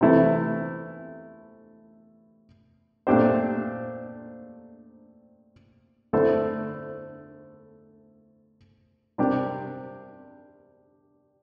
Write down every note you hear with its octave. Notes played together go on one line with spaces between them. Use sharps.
C3 E3 A3 E4
A#2 A3 D4 G4 C5
D3 A3 E4 A4 C5
C3 G3 D4 G4 A#4